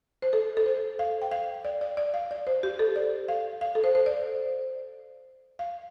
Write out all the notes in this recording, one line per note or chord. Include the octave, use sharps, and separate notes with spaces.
C5
A4
A4
C5
F5
G5
F5
D5
D5
D5
F5
D5
C5
G4
A4
D5
F5
F5
A4
C5
C5
D5
F5